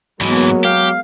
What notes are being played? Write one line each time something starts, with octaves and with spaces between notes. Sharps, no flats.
G#2 E3 F#3 G#3 A#3 B3
G4 F5